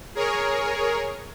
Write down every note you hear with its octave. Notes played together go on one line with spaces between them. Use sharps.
G#4 A#4 C#5